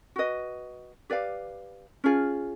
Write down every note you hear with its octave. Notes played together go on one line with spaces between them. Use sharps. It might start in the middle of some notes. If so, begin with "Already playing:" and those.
F#4 B4 D#5
G4 B4 D5 F5
C#4 F4 G#4